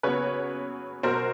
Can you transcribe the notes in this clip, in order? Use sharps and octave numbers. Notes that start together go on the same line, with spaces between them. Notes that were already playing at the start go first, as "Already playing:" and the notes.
C#3 F#3 B3 B4 C#5
B2 F#3 B3 A#4 C5